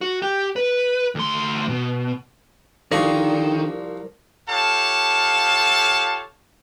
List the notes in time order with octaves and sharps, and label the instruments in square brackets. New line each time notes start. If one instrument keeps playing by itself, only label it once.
[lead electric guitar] F#4
G4
B4
D2 C6
B2
[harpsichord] C2 F3 C#6 [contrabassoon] D3 [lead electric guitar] D#3 [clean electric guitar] A#4 C5 D5
[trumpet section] F4 G4 A4 C#5 F5 A5